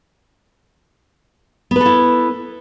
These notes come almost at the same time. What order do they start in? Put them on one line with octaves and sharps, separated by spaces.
B3 B4 A4 E4